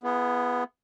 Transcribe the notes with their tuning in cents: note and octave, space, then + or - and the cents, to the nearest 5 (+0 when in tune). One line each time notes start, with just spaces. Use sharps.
B3 +0 E4 +45 G#4 +0